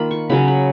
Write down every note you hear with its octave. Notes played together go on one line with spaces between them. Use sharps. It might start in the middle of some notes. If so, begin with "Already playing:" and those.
Already playing: D#3 A#3 F4 B5
C#6
C#3 F#3 C#4 B5
B5